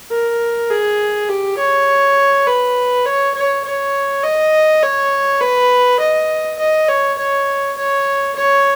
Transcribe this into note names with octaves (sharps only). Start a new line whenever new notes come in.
A#4
G#4
G4
C#5
B4
C#5
C#5
C#5
D#5
C#5
B4
D#5
D#5
C#5
C#5
C#5
C#5